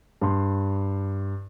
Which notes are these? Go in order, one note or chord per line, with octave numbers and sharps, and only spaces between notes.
G2 C6